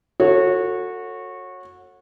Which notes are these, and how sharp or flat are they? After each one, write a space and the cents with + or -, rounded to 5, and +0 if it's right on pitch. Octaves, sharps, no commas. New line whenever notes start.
F#4 -20 A4 +25 C#5 -20